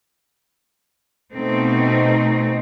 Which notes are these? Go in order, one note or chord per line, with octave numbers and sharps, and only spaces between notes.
B2 A3 C4 D#4